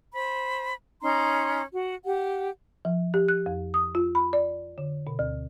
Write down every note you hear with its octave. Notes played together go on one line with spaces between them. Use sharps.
C5 B5
C#4 D#4 A#5 C6
F#4
G4 F#5
F3
G4
F#6
F2
D#6
F4
B5
D5
D3
B2
D2